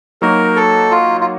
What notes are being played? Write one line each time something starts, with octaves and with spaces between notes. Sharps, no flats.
F#3 A#3 D#4 F#4 A#4
A4
F4
F4